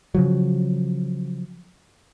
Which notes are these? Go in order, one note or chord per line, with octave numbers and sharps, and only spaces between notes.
C#3 F3 F#3